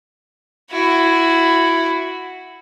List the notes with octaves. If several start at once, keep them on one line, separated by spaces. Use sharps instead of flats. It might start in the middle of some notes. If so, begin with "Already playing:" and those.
E4 F#4